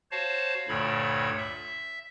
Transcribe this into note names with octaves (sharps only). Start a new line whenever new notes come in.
F#4 C5 C#5 F5 A5
D2 G2 A#2 D3 C#5 B5
E5